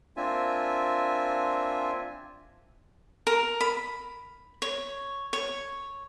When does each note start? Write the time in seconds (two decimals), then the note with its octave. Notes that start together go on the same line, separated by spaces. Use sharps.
0.17 A#3 C4 D4 F4 E5 G#5
3.27 A#4
3.60 B5
4.62 C#5
5.33 C#5